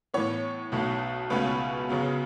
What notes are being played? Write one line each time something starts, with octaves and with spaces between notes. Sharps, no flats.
A2 E3 B3 C#5
B1 B2 A3
C#2 B2 A3 C#4 B4
F#2 C#3 F#3 B3